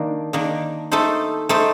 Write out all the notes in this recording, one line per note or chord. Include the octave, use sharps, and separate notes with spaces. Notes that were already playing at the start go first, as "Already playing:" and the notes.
Already playing: D#3 A#3 D4
D#3 A#3 D4
A3 D#4 A4 C5
A3 D#4 A4 C5